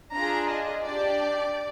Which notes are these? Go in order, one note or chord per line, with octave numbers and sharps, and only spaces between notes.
D4 F4 G#4 A#5
D#5
D4 G4 D5